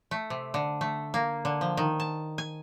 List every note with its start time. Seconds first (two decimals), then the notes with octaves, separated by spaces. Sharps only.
0.11 A3
0.30 C3
0.54 D3
0.81 A3
1.14 A#3
1.45 D3
1.61 F3
1.77 D#3
2.00 A5
2.38 G#5